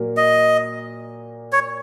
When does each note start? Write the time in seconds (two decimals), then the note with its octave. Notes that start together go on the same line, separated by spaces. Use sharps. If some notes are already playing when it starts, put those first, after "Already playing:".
Already playing: A#2 F#3 A#3
0.17 D#5
1.53 C#5